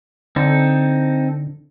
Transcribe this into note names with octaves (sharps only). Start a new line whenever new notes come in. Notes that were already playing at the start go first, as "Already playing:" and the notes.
D3 C4 D#4 A4